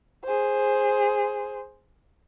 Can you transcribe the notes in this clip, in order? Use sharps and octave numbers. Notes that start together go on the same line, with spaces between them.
G#4 C5